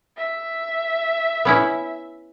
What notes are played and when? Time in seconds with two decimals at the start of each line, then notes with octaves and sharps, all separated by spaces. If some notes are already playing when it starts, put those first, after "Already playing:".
0.17 E5
1.45 B3 C#4 E4